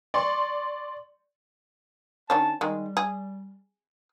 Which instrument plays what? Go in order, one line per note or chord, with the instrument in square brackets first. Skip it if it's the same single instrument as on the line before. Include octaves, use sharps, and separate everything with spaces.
[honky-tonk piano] D5 C6 C#6
[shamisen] D#3 C#4 D4 [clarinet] A5
[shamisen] D#3 G#3 [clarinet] G3
[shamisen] G#4